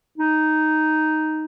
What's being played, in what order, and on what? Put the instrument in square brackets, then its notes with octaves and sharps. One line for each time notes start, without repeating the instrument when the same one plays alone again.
[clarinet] D#4